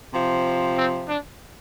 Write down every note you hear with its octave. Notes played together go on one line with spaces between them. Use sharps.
C3 F3
C4
D4